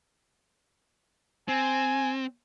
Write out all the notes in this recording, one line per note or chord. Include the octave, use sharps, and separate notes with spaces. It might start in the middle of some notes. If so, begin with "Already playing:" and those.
C4 G#5